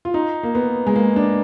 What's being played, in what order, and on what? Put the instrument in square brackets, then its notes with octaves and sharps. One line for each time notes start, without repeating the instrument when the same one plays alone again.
[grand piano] F4
D#4
A#3
B3
G#3
A#3
D4